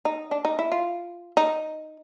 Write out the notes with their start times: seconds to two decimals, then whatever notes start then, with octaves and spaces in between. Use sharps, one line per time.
0.05 D#4
0.31 D4
0.45 D#4
0.59 E4
0.72 F4
1.37 D#4